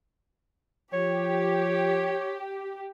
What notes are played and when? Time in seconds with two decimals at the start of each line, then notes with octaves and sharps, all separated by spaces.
0.93 F3 G4 C#5